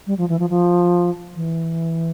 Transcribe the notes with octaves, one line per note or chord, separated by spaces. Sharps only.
G3
F3
E3
F3
F3
E3